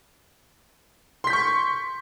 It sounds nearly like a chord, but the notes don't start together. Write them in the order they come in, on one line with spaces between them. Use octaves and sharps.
C6 B6 G6 C#6